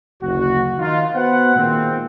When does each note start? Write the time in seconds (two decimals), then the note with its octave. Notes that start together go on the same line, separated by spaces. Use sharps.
0.22 F#1 D2 F#4
0.78 D#3 D#4 F4
1.15 B3 F#4 B4 C5 F#5
1.56 A#2 D#3 G#3 A#3 C4